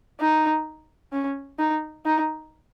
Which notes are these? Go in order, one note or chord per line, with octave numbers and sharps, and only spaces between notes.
D#4
C#4
D#4
D#4